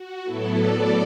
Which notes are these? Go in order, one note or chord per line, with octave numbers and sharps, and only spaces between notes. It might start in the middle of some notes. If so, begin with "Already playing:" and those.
Already playing: F#4
A2 F#3 B3 E4 A4
A2 F#3 B3 A4 D5